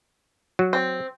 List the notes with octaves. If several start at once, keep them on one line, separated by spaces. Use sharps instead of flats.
F#3 F#4
C4